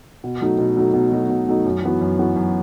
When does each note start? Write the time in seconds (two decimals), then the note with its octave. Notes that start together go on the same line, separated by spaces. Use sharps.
0.24 B2
0.41 F#3 A3 D#4
0.58 B2
0.77 F#3 A3 D#4
0.93 B2
1.11 F#3 A3 D#4
1.29 B2
1.48 F#3 A3 D#4
1.65 F#2
1.82 E3 B3 F#4
2.01 F#2
2.18 E3 B3 F#4
2.36 F#2